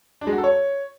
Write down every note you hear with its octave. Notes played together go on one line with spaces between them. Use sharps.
D4
G#3
F#4
A4
C#5